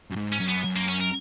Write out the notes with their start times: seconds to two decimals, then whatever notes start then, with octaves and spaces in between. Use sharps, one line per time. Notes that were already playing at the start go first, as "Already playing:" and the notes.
0.10 F#2
0.16 G#2
0.32 C#4
0.40 F#2
0.48 B3
0.64 F#2
0.77 A#3
0.89 C#4
1.01 A#4